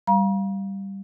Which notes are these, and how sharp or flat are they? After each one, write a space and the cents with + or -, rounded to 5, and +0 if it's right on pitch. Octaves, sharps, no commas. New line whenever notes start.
G3 +0 F5 +0 A#5 +40